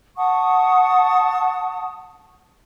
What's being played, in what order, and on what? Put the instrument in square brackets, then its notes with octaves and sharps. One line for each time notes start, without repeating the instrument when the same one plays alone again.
[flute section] F#5 A5 C#6 D#6